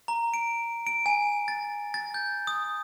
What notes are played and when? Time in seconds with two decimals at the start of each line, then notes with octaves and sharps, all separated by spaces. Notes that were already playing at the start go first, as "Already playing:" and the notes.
0.08 A#5
0.34 D7
0.87 D7
1.06 G#5
1.48 A6
1.94 A6
2.14 G6
2.47 D#6